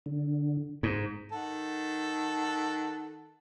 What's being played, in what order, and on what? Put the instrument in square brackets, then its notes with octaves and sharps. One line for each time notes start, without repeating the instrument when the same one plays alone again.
[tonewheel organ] D3
[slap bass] G#2
[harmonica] D#3 A4 F#5